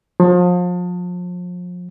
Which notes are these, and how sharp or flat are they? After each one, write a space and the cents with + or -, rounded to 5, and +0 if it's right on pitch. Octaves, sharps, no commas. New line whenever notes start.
F3 +35